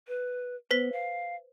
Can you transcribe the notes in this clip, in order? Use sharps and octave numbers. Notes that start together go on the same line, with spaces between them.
B4
B3 B4 C5 B6
F5